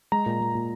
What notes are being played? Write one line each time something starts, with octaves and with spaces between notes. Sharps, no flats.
G#3 A#5
A#2
G#3
A#2